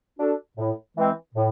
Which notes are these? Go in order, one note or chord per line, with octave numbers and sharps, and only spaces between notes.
D4 F#4 A4
A2
E3 G#3 C4
A2